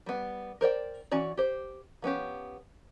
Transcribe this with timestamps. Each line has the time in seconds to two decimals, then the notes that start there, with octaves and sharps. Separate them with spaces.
0.06 G3 B3
0.61 A#4 C5 D5 G5
1.12 E3 C#4 F#4 D5
1.37 G4 C5
2.02 F3 B3 C#4 G4